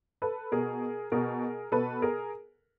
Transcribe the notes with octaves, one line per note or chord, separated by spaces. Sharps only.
A4 B4
B2 G#4 A#4
B2 G#4 A#4
B2 A4 B4
G#4 A#4